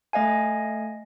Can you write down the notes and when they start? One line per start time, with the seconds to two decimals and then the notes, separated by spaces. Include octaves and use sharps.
0.13 A3 D#5 F5 G#5